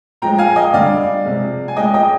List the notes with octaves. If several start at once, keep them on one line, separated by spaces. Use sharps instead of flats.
A#2 F3 G#3 G5 A#5
F5 G#5
D#5 G5
D3 G3 D5 F5
C3 F3 G#3
G#5
A#2 G#3 D#5 G5
D#5 G5